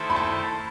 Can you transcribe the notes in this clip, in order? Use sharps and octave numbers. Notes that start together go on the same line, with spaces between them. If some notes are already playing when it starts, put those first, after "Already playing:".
Already playing: D#3 A3 E4 A4 C5
B5
A5